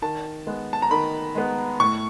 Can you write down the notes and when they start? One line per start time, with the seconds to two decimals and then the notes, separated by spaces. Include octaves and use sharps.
0.02 D#3 A5
0.47 G#3 B3
0.73 A5
0.82 A#5
0.91 D#3 B5
1.35 G#3 B3
1.80 A2 C#6